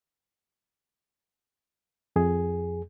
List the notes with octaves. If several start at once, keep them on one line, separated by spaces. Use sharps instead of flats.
F2 G#4